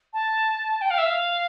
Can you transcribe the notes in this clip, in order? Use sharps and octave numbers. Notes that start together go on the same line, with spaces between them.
A5
G5
F5
E5
F5